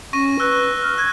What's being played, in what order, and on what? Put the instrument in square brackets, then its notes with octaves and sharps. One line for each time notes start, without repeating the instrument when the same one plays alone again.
[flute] C#4 [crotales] C#6 A#6 D#7
[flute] B4 [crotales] E6 F#6
[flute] F6
[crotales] F#6 [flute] G#6